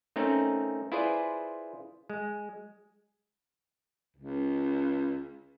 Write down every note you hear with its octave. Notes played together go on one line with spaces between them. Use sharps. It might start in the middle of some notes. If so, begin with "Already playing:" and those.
A3 C4 C#4 D#4 A#4
E4 F4 G#4 B4 C5 D5
G#3
C#2